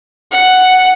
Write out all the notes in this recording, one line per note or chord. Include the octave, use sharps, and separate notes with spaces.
F#5